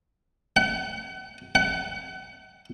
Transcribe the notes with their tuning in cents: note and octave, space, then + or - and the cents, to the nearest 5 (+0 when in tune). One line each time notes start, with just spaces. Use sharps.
F#5 +35
F#5 +30